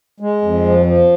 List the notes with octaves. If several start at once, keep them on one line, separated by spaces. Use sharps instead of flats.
G#3
F2
F3
F3